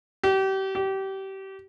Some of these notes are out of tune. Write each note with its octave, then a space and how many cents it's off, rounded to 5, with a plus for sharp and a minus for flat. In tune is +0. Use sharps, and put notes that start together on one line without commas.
G4 -30
G4 -25